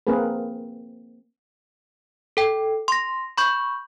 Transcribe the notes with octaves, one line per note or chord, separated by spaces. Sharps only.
A#3 C4 G#4 A#4 B4
A4 G5
C6 A#6
B5 C#6 G6